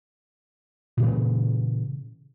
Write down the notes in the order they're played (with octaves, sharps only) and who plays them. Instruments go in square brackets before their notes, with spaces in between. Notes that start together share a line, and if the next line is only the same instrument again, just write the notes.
[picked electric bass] A#2 C#3 E3